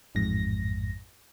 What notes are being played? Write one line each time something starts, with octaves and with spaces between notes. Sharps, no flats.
A1 F2 G#2 A#6